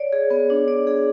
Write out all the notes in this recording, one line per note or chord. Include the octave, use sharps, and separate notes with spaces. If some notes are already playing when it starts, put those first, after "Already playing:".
Already playing: C#5 D5
G#4
B3
D4
D5
G#4